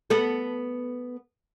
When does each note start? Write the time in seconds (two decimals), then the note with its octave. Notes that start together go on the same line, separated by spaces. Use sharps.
0.10 B3 A4